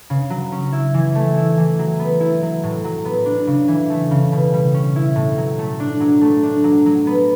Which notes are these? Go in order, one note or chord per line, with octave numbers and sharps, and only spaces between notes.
C#3
F#3
C#4
E4
E3
A3
E4
E3
F#3
B3
E4
F#3
A2
F#3
B3
D4
C#3
E3
A3
C#3
B2
G3
C#4
E4
A2
F#3
A3
D4
F#3
A3
D4
F#3
F#3
B3